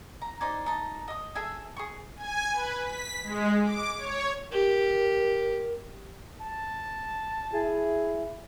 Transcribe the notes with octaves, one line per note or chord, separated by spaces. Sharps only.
A#5
D#4 C5 D5 G#5
D#4 A5
D#5 D#6
G#4 A4 E5 G#5
G#4 C#6
G#5
B4
B6
G#3
D6
C#5
G4 A#4
A5
E4 G#4